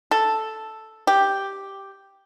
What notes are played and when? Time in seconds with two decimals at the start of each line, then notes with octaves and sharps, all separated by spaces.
0.11 A4
1.07 G4